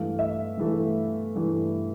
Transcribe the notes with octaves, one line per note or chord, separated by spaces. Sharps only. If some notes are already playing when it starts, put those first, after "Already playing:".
Already playing: G2 E3 A3 F5
E5
G2 E3 A3
G2 E3 A3